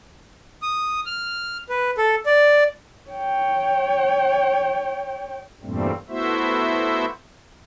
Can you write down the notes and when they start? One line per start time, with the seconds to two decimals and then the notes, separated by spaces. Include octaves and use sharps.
0.62 D#6
1.06 F6
1.69 B4
1.98 A4
2.26 D5
3.10 C#5 G5
5.63 E2 G2 A#2 G3 A3 C4
6.09 A3 B3 E4 F#4 C5 E5